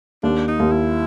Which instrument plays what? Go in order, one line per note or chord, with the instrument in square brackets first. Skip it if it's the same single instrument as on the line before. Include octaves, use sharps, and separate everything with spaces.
[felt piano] D#2 [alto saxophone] D4
[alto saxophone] D#4
[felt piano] D#2
[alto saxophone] E4